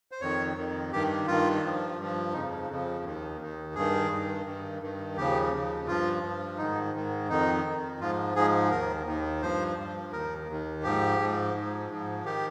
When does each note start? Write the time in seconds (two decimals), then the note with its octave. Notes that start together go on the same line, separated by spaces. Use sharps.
0.12 C5
0.21 F2 D#3 C#5
0.56 F2 D#3
0.92 G2 D#3 G4
1.27 G2 D#3 F4
1.63 G2 F3
1.99 G2 F3
2.34 F2 C#3 F3 D#4
2.69 F2 C#3 F3
3.04 D#2 D#3
3.40 D#2 D#3
3.75 G2 D#3 G#4
4.11 G2 D#3
4.46 G2 D#3
4.82 G2 D#3
5.16 D#2 C#3 F3 G4
5.52 D#2 C#3 F3
5.88 G2 F3 F4
6.23 G2 F3
6.58 G#2 D#3 D#4
6.94 G#2 D#3
7.29 F2 D#3 D#4
7.64 F2 D#3
8.00 G#2 F3 F4
8.36 G#2 F3 G#4
8.71 D#2 D#3 A#4
9.06 D#2 D#3
9.42 G2 F3 C5
9.77 G2 F3
10.13 D#2 D#3 A#4
10.49 D#2 D#3
10.83 G#2 F3 G4
11.19 G#2 F3
11.54 G#2 F3
11.90 G#2 F3
12.25 D#3 G4